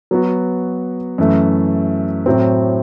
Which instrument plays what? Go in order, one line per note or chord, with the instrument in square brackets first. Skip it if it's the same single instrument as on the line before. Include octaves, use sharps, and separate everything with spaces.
[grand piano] F#3 B3 F#4
F#2 E3 A3
A2 F#3 C4